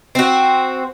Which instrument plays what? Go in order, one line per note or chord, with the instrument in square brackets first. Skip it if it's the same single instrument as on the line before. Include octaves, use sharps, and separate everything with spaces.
[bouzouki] C4 F#4